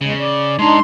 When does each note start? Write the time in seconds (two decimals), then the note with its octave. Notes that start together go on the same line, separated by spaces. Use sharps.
0.01 E2 C#3 G#3
0.20 D5
0.59 G#3 D4 D#4 A#5 C6